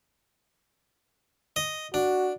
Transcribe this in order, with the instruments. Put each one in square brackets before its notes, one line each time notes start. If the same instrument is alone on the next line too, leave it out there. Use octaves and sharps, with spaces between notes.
[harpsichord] D#5
[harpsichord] D4 [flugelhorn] F#4